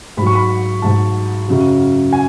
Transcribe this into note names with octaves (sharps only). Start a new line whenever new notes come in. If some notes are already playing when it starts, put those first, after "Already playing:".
G#2 F#3 B5 C#6
B5
G#2 F#3 A5
F#2 C#3 F#3
G#5